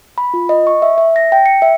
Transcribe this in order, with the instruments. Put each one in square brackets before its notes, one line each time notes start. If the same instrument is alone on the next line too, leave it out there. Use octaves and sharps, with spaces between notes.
[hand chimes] B5
F4
D#5
C#6
E5
E5
A#6
G5
C#7
E5